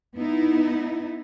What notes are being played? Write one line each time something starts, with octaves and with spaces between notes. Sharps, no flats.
B3 D#4 E4